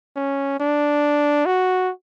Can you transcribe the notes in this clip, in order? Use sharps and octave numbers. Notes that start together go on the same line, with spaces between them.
C#4
D4
F#4